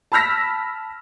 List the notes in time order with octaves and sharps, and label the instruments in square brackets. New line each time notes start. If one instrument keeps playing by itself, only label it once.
[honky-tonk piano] A5 B5 E6 F6 A#6 B6